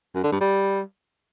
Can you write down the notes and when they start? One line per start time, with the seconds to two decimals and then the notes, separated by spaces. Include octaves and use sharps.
0.15 F#2
0.23 D3
0.32 G2
0.41 G3